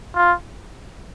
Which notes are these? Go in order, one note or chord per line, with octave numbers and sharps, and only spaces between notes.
F4